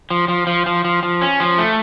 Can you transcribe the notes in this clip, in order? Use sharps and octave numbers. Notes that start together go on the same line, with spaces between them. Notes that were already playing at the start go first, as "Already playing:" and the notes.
F3
F3
F3
F3
F3
F3
C#4
F3
A3